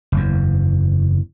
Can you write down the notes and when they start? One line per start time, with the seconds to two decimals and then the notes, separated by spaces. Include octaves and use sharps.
0.12 F#1 E2